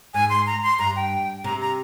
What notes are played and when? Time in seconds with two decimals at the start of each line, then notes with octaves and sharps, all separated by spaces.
0.14 G#2 G#5
0.30 C6
0.46 A#5
0.63 C6
0.79 G2 A#5
0.96 G5
1.44 C3 A#5
1.61 A#5